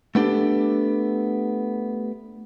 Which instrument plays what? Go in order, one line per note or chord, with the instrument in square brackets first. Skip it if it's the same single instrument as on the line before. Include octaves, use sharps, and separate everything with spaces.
[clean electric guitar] A3 B3 D4 G4 A4